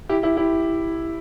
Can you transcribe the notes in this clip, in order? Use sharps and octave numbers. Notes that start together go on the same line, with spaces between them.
E4 G4
E4 G4
E4 G4